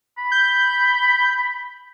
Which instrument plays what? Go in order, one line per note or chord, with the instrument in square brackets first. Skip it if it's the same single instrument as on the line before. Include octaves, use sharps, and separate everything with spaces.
[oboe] B5
[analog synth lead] G6